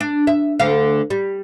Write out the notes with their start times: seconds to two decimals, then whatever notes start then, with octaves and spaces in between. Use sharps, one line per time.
0.01 D4
0.27 E5
0.60 D2 D3 F5
1.10 G3